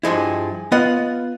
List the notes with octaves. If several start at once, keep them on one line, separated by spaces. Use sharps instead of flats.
G2 F3 G#3 E4
B3 F4 D#5 F#5